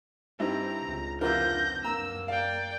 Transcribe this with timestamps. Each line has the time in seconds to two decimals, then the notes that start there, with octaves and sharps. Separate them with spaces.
0.40 G2 C4 D#4 E4 A#5
0.84 C#2
1.21 F1 C4 D4 E4 F4 A#4 G6 A#6
1.84 F#2 A#3 A#5 E6
2.28 D5 F5 G5